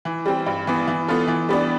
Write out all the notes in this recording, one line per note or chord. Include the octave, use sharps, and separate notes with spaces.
E3
G3 C4
G2
E3 B3
E3
B3 F4 A4
E3
G3 B3 D4